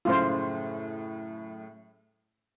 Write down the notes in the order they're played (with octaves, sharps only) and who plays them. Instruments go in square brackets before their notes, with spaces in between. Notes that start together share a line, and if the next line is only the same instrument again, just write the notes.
[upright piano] F#2 A2 C#3 [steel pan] F4 C5